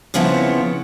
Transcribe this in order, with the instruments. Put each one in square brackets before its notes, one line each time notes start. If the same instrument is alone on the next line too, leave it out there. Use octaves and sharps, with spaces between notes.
[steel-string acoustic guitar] C#3 F3 B3 C4 E4 C#5